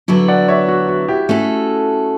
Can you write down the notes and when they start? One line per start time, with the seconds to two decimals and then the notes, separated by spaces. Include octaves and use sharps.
0.08 D3 F#3 B3 E4
0.28 D5 F#5
0.48 C#5 E5
0.68 F#4
0.89 F#4
1.08 E4 G4
1.29 A3 C#4 E4 F#4 A4